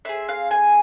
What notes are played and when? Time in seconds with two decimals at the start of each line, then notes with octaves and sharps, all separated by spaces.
0.05 C4 G#4 E5
0.29 F5
0.51 G#5